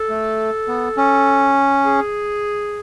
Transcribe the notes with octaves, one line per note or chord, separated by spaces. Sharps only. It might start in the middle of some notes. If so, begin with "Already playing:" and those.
Already playing: A4
A3
B3
C#4
G#4